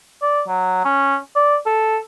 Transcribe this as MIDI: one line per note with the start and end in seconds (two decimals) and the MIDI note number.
0.22 0.42 74
0.48 0.84 54
0.85 1.17 61
1.36 1.56 74
1.66 1.98 69